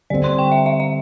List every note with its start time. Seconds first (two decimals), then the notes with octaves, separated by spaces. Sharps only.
0.10 D3 G3 C4 D5
0.24 C6
0.39 G5
0.52 E5
0.66 E5
0.80 E5